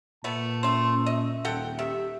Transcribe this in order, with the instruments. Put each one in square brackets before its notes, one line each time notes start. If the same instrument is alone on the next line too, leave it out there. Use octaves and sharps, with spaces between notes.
[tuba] A#2 [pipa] A3 B3 [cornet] A5
[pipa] A3 C5 [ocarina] C#4
[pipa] D#5 [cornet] E5
[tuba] D#1 [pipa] A4 F#5 G5
[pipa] D#3 [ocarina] G4 [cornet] E5